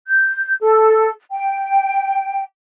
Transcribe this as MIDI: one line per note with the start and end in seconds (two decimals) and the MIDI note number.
0.07 0.56 91
0.61 1.11 69
1.31 2.43 79